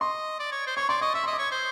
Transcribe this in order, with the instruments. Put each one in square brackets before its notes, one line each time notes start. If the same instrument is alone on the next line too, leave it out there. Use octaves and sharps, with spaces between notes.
[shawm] D#5 [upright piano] C6
[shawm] D5
C#5
C5
[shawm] C#5 [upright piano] C#6
[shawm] D5 [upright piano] C6
[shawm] D#5 [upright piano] C#6
[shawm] E5 [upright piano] C#6
[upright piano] C6
[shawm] D#5
[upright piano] D6
[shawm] C#5 [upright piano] D#6
[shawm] C5